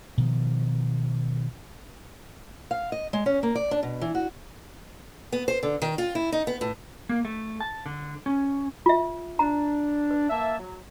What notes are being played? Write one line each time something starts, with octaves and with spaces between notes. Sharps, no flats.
B2 D#3 F3
F5
D#5
G#3
C#4
A#3
D5
D4
B2
E3
F#4
B3
C5
D3
D#3
F4
E4
D#4
B3
A2
A#3
A3
A5
D3
C#4
F4 E5
D4 A#5
B4
A#3 E5 A5
F#3